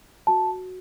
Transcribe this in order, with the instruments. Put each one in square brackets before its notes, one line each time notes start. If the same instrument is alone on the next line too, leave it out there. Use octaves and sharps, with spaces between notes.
[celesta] F#4 A5